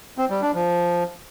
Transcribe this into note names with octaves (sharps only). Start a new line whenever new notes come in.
C4
G3
D4
F3